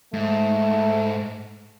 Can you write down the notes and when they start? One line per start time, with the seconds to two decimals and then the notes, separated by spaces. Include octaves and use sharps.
0.14 G#2 A3